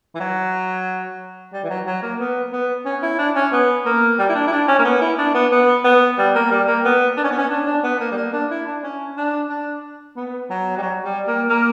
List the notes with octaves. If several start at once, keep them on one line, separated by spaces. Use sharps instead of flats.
E3
F#3
G3
E3
F#3
F#3
A#3
B3
B3
C#4
E4
D4
C#4
B3
A#3
G3
E4
D4
E4
D4
C#4
A#3
B3
E4
D4
B3
B3
B3
G3
A#3
G3
A#3
B3
D4
C#4
B3
C#4
D4
D4
B3
A#3
G3
A#3
D4
E4
D4
C#4
D4
D4
B3
F#3
G3
F#3
G3
A#3
A#3